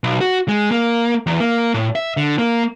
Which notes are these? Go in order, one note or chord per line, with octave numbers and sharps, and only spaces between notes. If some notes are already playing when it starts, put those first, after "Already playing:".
B1
F#4
G#3
A#3
E2
A#3
A2
E5
D3
A#3